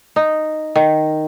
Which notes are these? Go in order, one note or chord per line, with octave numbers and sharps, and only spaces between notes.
D#4
D#3